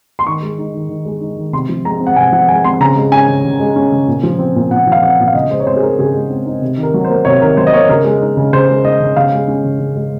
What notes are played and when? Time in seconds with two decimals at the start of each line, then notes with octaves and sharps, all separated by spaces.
0.19 C6
0.27 D#3 C#6
0.42 G#3
0.58 D#4
0.74 D#3
0.89 D#3
1.05 G#3
1.21 D#4
1.37 D#3
1.53 C3 C6
1.69 F3
1.85 G#3 A#5
2.01 C4
2.07 F#5
2.16 C3 G#5
2.32 F3 F#5
2.49 G#3 G#5
2.64 C4 C6
2.80 C#3 A#5
2.96 G#3
3.12 C#4 G#5
3.28 C#3
3.45 C#3
3.60 G#3
3.76 C#4
3.92 C#3
4.07 A#2
4.23 F3
4.39 C4
4.55 A#2
4.71 A#2 F#5
4.87 F3
4.92 F5
5.02 C4 F#5
5.19 A#2
5.28 F5
5.34 C#3 D#5
5.50 G#3 C5
5.60 C#5
5.67 C4 C5
5.76 G#4
5.82 D#4 A#4
5.99 C#3 G#4
6.15 G#3
6.30 C4
6.46 D#4
6.62 C3
6.77 D#3
6.83 A#4
6.94 F#3
7.04 C5
7.10 A#3
7.25 C3 C#5
7.42 D#3 A#4
7.57 F#3 C5
7.67 D#5
7.72 A#3 C#5
7.89 C#3 A#4
8.04 G#3
8.21 D#4
8.37 C#3
8.53 C#3 C5
8.69 G#3
8.84 D#4 D#5
9.00 C#3
9.16 C#3 F5
9.32 G#3
9.48 C#4
9.64 C#3
9.80 C#3
9.96 G#3